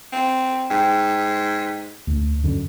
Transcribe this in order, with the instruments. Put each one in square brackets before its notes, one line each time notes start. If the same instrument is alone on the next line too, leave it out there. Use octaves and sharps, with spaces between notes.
[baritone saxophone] C4
[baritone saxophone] G#2 [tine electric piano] G5
[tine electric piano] D2
F#2 D3